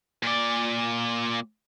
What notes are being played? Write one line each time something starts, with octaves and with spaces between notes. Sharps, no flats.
A#2 D5